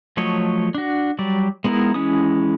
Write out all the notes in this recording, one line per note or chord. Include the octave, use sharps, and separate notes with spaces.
F3 F#3 A3 C#5 D#5
D4 F#4
F#3 G3 D5
G#3 B3 D#4 E4 A#4
E3 G#3 C#4 E4 D#6